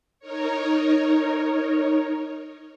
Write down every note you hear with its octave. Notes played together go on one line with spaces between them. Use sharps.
D#4 A#4 C#5